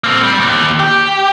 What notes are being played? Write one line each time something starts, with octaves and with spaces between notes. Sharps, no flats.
A#3 C4
G3
D#2
G4